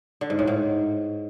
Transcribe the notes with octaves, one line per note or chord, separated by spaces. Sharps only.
D3
G#2
A2
G#2